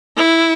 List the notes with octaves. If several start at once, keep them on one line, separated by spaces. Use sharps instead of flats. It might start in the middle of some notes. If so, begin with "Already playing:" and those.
E4